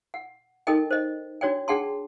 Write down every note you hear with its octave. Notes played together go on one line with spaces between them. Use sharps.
F#5
D#4 A4 A#4 D#5 G5
C5 D#5
D4 F#4 C#5 D5 G5
D4 G#4 F#5 G5 A5 C6